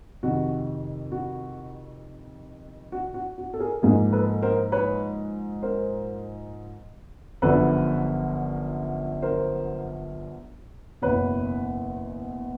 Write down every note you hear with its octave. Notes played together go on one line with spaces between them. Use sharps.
F2 C3 D#3 F#4
F#4
F#4
F#4
F#4
A4
G#4 A#4
G#2 F3 A#3 G#4 A#4
A4 B4
A#4 C5
B4 C#5
A#4 C5
G1 F#2 D3 F3 A4 B4
A#4 C5
F#1 E2 B2 B4 C#5